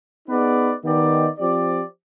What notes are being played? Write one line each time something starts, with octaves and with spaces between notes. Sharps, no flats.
B3 D#4 G#4 B4 D5
D#3 B3 D#4 G4 D5
F3 C4 G4 D5